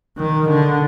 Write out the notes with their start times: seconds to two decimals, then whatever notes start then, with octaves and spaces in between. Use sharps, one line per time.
0.17 D#3
0.49 D3